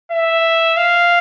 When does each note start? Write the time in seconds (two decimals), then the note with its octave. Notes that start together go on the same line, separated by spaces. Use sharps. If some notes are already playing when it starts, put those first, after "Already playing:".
0.12 E5
0.77 F5